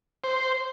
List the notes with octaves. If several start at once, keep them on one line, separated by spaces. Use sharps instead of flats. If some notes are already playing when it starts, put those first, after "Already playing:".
C5